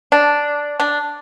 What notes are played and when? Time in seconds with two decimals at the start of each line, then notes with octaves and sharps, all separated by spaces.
0.12 D4
0.80 D4